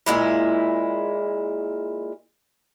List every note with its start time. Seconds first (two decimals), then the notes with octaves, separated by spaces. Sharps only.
0.06 A#2 D#3 G#3 E4